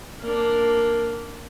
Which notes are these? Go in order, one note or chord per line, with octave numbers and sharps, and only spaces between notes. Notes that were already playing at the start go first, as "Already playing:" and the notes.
A#3 D4